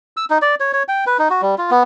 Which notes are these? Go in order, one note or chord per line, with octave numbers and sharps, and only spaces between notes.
E6
D#4
D5
C#5
C#5
G5
B4
D#4
F#4
G3
F4
B3